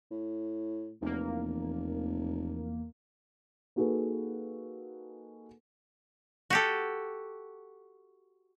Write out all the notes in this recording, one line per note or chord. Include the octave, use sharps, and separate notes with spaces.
A2
F1 E2 A#3
A#3 D#4 F#4 G#4 A4 B4
F#4 G4 A4